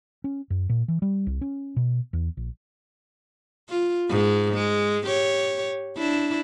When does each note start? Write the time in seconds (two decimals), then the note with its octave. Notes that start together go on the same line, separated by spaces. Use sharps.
0.24 C#4
0.50 F#2
0.70 A#2
0.88 E3
1.02 G3
1.27 C2
1.41 C#4
1.77 B2
2.13 E2
2.37 A#1
3.69 F4
4.10 G#2 G#3
4.53 G#3
5.07 G4 C#5
5.97 D4 E4